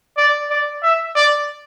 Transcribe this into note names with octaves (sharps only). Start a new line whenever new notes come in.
D5
D5
E5
D5